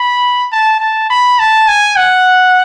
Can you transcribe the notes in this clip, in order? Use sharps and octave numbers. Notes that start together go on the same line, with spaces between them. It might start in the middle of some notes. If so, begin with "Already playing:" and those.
Already playing: B5
A5
A5
B5
A5
G#5
F#5